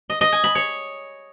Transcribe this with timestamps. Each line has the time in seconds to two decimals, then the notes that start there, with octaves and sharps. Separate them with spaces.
0.10 D#5
0.21 D#5
0.32 G#5
0.44 B5
0.55 C#5